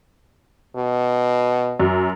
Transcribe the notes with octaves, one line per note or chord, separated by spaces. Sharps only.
B2
F#2